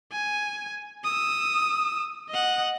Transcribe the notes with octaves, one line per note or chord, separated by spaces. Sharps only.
G#5
D#6 E6
D#5 F#5